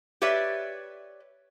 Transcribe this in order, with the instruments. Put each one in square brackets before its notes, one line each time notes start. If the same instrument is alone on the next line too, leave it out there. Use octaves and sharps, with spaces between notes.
[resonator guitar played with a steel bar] G4 B4 C#5 D5 E5